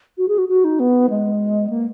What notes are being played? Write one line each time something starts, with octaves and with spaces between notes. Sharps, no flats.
F#4
G#4
F#4
F#4
D#4
B3
G#3
A#3